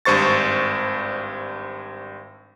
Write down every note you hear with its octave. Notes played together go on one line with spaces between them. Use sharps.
G#1 G2 C5 C#6 A6